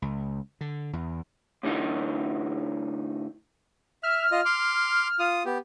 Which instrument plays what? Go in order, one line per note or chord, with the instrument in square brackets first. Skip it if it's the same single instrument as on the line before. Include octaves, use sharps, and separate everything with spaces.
[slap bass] C#2
D3
E2
[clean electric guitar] A2 D3 E3 D#4
[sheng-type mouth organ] E5 [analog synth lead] F6
[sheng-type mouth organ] F4 D#5
C6 D6
F4 D#6
B3 G4